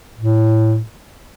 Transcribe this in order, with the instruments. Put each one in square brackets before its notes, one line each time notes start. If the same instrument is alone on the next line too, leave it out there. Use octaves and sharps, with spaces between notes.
[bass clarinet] A2